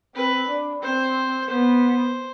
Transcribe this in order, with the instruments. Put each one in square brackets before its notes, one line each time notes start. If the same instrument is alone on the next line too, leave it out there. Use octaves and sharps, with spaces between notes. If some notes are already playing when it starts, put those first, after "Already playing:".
[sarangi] C4 [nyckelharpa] B4
[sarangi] D4
[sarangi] C4 [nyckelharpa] C5
[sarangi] B3 [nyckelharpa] C5